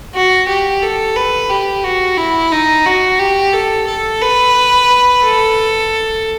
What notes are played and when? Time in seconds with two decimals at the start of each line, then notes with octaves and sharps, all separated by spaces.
0.14 F#4
0.48 G4
0.82 A4
1.16 B4
1.50 G4
1.84 F#4
2.17 E4
2.52 D#4
2.85 F#4
3.19 G4
3.53 A4
3.87 A4
4.21 B4
5.22 A4